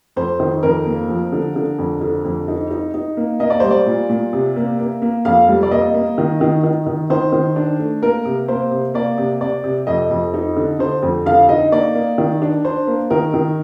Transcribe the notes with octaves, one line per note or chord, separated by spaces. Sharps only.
F2 C5
D#3
F2 A#4
A#3
F3
D3
D3
F2
D3
F2
D#4
D#4
D#4
A#3
A#3 D#5
D5
G3 C5
D5
A#2
A#2
C3
A#3
A#3
A#3
F2 F5
G3
D5
A#3 D#5
A#3
D#3
D#3
D#3
D#3
D#3 C5
D#3
D4
A3
A#3 A#4
C3
A#3 C5
C3
A#3 D5
C3
C3 D5
C3
F2 D#5
F2
D#4
D3
D3 C5
F2
D3 F5
D#4 D#5
A#3 D5
A#3
D#3
D4
D4 C5
A#3
D#3 A#4
D#3